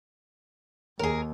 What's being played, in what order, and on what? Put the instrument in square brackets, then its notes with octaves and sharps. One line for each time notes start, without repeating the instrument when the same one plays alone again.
[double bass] D#2 [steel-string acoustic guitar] G#4 A#4